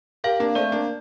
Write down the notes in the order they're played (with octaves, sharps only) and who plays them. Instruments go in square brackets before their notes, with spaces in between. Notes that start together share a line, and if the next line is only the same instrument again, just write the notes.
[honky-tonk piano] G4 A#4 [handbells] F5
[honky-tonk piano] A#3 D4
[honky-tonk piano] A3 C4 [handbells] D5
[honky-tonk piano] A#3 D4